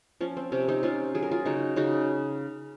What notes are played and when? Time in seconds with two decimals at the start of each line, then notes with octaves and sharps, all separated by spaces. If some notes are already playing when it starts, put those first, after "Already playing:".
0.21 F3 C#4
0.37 C4
0.52 C3 C#4
0.68 C4 D#4
0.83 C3 C#4 F4
1.15 F#3 G#4
1.23 A#4
1.31 F4 G#4
1.45 C#3 D#4 F#4
1.76 C#3 D#4 F#4